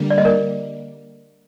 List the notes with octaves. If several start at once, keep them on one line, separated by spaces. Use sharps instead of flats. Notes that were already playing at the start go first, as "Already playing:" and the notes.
Already playing: D3 G3 A#3
D5
D#5
A#4 D5